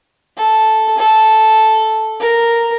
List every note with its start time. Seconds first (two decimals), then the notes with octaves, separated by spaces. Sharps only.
0.37 A4
0.97 A4
2.20 A#4